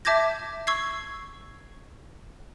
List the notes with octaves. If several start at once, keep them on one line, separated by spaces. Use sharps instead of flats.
E5 A5 D6 G6 G#6 A#6
C#6 E6 G#6 C7